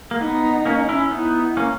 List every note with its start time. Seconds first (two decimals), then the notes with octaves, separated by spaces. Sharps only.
0.11 A#3
0.21 B3 D#4
0.66 A#3 C#4
0.89 C#4 E4
1.11 B3 D#4 E4
1.57 A#3 C#4